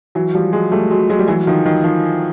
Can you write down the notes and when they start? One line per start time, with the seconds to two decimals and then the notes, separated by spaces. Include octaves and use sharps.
0.15 E3 F#3
0.35 F3 G3
0.53 F#3 G#3
0.72 G3 A3
0.91 F#3 G#3
1.10 F#3 G#3
1.19 G3
1.28 E3 F#3
1.47 D#3 F3
1.66 D#3
1.84 D#3 F3